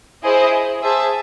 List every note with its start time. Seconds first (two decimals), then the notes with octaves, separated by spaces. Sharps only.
0.24 E4 G#4 C5 D#5
0.81 G#4 C5 E5 A5